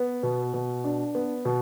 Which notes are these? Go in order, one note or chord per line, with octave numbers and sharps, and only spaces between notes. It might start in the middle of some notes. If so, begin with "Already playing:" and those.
Already playing: B3
B2
B2
D4
B3
B2